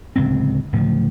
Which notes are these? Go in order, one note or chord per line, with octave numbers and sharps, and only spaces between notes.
D1 C#2 C3 C4
D1 A2 C#3 F3